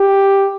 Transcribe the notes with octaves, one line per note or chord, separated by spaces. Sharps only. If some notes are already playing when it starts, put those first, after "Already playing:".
Already playing: G4